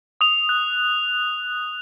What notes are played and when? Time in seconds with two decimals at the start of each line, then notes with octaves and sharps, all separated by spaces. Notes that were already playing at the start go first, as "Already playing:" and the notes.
0.21 D#6 F7
0.49 F#6